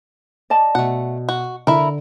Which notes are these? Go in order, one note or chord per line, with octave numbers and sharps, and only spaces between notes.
D5 D#5 A5
B2 A3 F#5
F#4
D3 E4 A#4